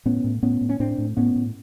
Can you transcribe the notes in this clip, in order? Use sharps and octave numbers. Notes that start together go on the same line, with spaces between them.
A2 B3 C#4
A2
A2 B3 C#4
A2
C#4
A2 C4 D4
A2
A2 B3 C#4
A2